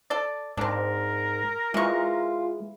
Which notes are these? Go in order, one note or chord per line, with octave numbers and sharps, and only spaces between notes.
A4 D5
G#2 C4 D4 A#4
E3 G#3 F4 C#6